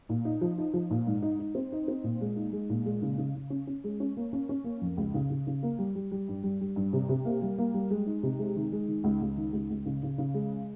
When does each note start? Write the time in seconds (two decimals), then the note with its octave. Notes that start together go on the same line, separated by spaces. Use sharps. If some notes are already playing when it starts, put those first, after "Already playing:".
0.09 A#2
0.25 D#4
0.41 F3
0.58 D#4
0.74 F3
0.90 A#2
1.07 G#2
1.22 D#4
1.39 D#4
1.55 C4
1.72 D#4
1.88 C4
2.04 A#2
2.21 G#3
2.36 D#4
2.53 G#3
2.69 A#2
2.86 G#3
3.02 C#3
3.18 C#3
3.35 C#3
3.50 C#4
3.67 C#4
3.84 G#3
4.00 C#4
4.17 A#3
4.33 C#4
4.49 C#4
4.64 A#3
4.81 F2
4.97 C#2
5.14 C#3
5.30 C#3
5.47 C#3
5.63 A#3
5.79 G3
5.95 G3
6.11 G3
6.28 G2
6.43 G3
6.61 G3
6.76 G2
6.93 C3
7.09 C3
7.25 A#3
7.42 G3
7.58 A#3
7.74 G3
7.91 G#3
8.07 D#4
8.23 C3
8.39 G#3
8.56 D#3
8.72 G#3
8.88 D#3
9.04 C#2
9.21 C#2
9.38 D#3
9.53 C#2
9.70 C#2
9.86 C#3
10.03 C#3
10.18 C#3
10.34 G#3